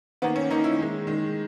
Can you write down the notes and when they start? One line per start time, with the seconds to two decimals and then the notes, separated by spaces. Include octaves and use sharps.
0.22 D#3 A#3 B3
0.36 C#4
0.50 D#3 A#3 D#4
0.64 E4
0.79 D#3 G#3
1.07 D#3 G#3